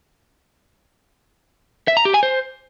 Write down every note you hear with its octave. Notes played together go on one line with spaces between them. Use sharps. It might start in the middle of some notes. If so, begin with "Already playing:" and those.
E5
A#5
G4
G#5
C5